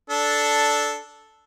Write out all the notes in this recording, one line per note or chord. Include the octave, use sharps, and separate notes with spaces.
D4 A4